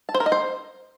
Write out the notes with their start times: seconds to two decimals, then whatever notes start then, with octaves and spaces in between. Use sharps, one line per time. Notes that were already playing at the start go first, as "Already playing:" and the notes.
0.09 A5
0.15 C5
0.20 A#4
0.26 D#5
0.32 C5